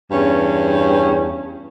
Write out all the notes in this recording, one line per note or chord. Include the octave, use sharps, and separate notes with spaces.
E2 G2 C#4